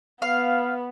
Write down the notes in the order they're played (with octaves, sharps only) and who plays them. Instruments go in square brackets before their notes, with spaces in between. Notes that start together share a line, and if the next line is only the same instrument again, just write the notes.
[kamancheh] B3 [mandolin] F5